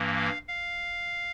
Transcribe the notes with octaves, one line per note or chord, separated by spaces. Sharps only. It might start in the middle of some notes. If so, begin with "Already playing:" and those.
Already playing: G2 E3 A#3
F5
F5